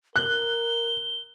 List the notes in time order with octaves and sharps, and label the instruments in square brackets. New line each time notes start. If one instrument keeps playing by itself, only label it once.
[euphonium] A#4 [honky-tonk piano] F#6 [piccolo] G7